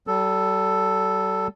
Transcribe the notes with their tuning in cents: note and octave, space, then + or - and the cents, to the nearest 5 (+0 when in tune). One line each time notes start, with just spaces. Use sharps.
G3 -40 A4 +0